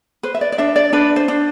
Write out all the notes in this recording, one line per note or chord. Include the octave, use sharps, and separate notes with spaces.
B4 C5
E5
D5
D5
D4 E5
D5
D4 B4
C5
D4